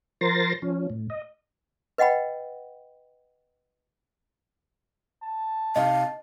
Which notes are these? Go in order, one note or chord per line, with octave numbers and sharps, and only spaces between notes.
F3 A#4 C5 C6 A6 A#6
F3 C#4
A2
D#5
B4 D#5 F#5 G5 B5
A5
C3 D#4 D#5 F5